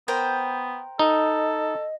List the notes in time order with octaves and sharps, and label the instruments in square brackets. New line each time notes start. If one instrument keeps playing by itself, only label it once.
[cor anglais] B3 [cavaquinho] A#4 C5 G5
[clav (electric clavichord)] D#4 [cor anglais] A4 [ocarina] D#5